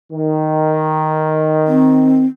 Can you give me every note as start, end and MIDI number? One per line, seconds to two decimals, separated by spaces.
0.11 2.27 51
1.67 2.25 60